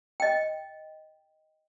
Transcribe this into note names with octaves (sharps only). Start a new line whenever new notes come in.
D#5 G5